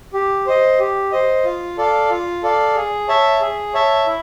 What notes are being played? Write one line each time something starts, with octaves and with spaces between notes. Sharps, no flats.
G4
C5 D#5
G4
C5 D#5
F4
A4 D5 F5
F4
A4 D5 F5
G#4
C#5 E5 A5
G#4
C#5 E5 A5
E4